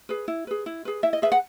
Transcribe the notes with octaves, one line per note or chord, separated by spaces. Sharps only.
G#4 B4
E4
G#4 B4
E4
G#4 B4
E4 E5
D#5
G#4 B4 E5
F#5